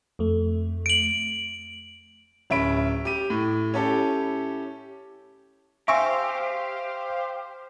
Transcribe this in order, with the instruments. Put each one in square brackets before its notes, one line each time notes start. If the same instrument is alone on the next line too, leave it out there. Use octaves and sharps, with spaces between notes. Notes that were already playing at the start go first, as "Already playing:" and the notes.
[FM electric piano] F2 A3
[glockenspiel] D7 F#7
[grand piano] D1 C#4 E5 B5 D7
G4 D#7
A2
C#4 E4 G4 A4
[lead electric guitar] G4 [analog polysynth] C5 F5 [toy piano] E5 G#5 [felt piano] C6 C#6 E6